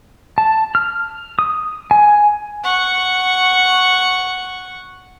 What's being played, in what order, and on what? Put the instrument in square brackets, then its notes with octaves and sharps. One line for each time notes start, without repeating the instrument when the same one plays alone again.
[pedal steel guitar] A5
F6
D#6
G#5
[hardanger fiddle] F#5 C#6